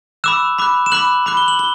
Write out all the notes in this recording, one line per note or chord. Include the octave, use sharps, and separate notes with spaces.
B5 D6 E6 F#6 E7
B5 D6 F#6
E7
B5 D6 F#6 F#7
B5 D6 F#6
G7
F#7
G7